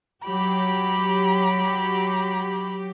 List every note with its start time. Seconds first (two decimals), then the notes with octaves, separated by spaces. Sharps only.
0.25 F#3 G4 B5